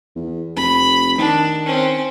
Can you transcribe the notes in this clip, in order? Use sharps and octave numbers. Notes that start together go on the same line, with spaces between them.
E2
F1 B5
D#3 D4
C4 C#4